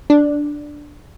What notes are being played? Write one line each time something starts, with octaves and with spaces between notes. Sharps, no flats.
D4